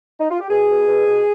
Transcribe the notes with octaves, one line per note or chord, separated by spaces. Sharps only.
D#4
F4
G4
B2 G#4
B2
B2
B2